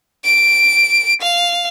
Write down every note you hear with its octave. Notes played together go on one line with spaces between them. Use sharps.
D7
F5